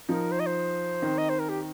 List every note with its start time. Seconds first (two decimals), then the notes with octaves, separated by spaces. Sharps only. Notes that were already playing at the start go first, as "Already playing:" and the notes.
0.08 F3 D#4 A#4
0.32 C5
0.40 D#5
0.47 C5
1.02 D#3 C4 D#4
1.18 D#5
1.29 C5
1.39 A#4
1.49 G4